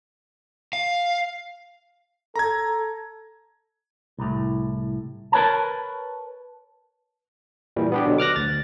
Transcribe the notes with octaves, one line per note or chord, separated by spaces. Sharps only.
F5
A4 A#5 G#6
C2 A2
A#4 B4 C#5 A5
A#2 E3 G3
B3 D4 G4
B2 D3 F#3
D6 F6 F#6 A#6
D2 A6